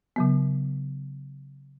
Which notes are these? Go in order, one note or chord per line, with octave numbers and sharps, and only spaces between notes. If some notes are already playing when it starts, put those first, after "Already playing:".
C#3 F#3 B3